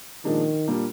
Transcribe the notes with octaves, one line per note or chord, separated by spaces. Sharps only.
A#2 D#3 F3 G#3 D4
A#2 G3 A#3 D4 G4